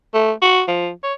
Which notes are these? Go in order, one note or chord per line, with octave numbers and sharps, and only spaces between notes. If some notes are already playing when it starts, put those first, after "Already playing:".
A3
F#4
F3
C#5